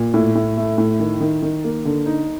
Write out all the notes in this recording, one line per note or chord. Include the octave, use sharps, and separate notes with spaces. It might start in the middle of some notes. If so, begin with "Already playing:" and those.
Already playing: A#2
A2
A2
A3
A2
D#3
D#3
D#3
A#3
D3
D#4